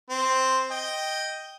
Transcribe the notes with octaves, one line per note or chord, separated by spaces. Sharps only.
C4
D#5 G5